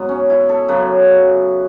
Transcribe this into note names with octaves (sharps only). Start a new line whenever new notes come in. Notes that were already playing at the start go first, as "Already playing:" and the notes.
Already playing: G#2 F#3 B3
C#4
E4
A4
F#2 C#3 F#3 B4